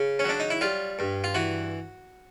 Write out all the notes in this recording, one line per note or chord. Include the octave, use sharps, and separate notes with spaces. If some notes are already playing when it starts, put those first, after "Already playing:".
Already playing: C#3
C#4
F#3 D4
D#4
E4
G3 F4
G2
F4
E3 F#4